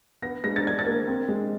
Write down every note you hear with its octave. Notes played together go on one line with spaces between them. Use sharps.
B3 A#6
G#3 A#6
A6
D4 G#6
A6
A#3
C4
G#3